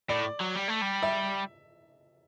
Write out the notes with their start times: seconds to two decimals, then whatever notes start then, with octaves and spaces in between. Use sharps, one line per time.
0.09 A2 D5
0.41 F#3
0.56 G3
0.69 A3
0.82 G3
1.03 E5